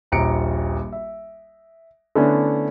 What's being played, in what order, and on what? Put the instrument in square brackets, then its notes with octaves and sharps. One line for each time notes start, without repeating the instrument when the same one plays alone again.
[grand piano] D#1 A#1 A#5 C#7 D7
E5
D3 A3 B3 C#4 D4 E4